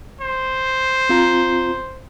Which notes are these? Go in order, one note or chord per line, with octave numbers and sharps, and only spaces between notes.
C5
C4 F4 A#5